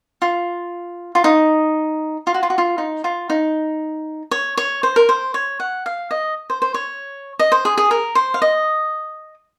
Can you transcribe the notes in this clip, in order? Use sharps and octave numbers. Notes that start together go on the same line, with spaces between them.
F4
F4
D#4
F4
F#4
F4
F#4
F4
D#4
F4
D#4
C#5
C#5
C5
A#4
C5
C#5
F#5
F5
D#5
C5
C5
C#5
D#5
C5
G#4
G#4
A#4
C5
F5
D#5